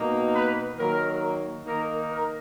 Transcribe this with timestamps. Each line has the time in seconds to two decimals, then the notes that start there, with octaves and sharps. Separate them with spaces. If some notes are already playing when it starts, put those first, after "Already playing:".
Already playing: B2 A#3 D#4
0.32 B4
0.76 D#3 F#3 A#3 A#4
1.66 D#3 A#3 D#4 A#4
2.10 A#4